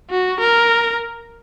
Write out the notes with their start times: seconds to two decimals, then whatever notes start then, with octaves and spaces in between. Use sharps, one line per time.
0.10 F#4
0.40 A#4